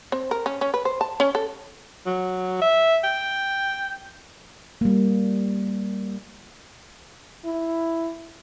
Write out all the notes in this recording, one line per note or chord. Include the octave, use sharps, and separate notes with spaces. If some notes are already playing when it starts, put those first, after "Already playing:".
C4
A#4
C#4
C#4
B4
C5
A5
C#4
A4
F#3
E5
G5
G3 A#3
E4